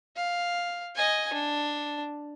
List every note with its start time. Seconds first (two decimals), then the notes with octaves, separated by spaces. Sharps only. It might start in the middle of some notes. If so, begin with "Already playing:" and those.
0.17 F5
0.95 D#5 G#5
1.34 D4